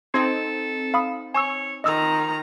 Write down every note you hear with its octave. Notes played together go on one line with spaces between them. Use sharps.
C4 D#4 A4 C6 G#6
F5 B5 D#6
C#5 G#5 C#6 E6
D#3 F3 D#5 A#5 D#6 E6